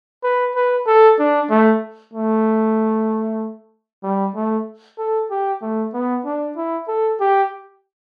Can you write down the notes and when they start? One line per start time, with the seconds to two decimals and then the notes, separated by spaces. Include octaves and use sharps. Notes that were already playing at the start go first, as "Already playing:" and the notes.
0.24 B4
0.55 B4
0.87 A4
1.19 D4
1.50 A3
2.14 A3
4.03 G3
4.35 A3
4.98 A4
5.31 G4
5.62 A3
5.94 B3
6.25 D4
6.57 E4
6.88 A4
7.20 G4